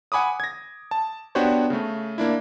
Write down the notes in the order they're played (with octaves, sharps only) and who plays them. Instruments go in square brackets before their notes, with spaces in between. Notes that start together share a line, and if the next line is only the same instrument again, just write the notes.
[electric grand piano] F#5 G#5 B5 D6 D#6
G#6 A#6
A5
B3 D4 F#4 G4 C5 C#5
C#3 A3
A#3 D4 E4